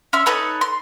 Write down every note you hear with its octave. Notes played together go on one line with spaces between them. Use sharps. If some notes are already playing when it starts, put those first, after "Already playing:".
C#4 E5 C6
D#4 A4 B4 C#5
C6